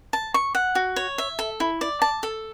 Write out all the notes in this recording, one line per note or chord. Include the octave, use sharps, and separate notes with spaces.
A5
C#6
F#5
F#4
C#5
E5
A4
E4
D5
A5
A4